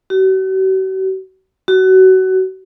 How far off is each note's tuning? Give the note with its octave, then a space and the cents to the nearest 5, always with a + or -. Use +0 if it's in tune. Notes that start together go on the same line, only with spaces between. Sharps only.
F#4 +45
F#4 +25